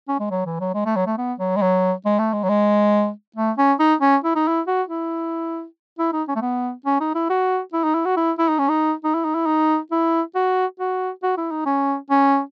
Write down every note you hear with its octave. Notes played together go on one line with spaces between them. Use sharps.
C#4
G#3
F#3
E3
F#3
G#3
A3
F#3
A3
B3
F#3
G#3
F#3
G#3
A3
G#3
F#3
G#3
A3
C#4
D#4
C#4
E4
D#4
E4
F#4
E4
E4
D#4
C#4
A3
B3
C#4
D#4
E4
F#4
E4
D#4
E4
F#4
E4
E4
D#4
C#4
D#4
D#4
E4
D#4
E4
D#4
E4
F#4
F#4
F#4
E4
D#4
C#4
C#4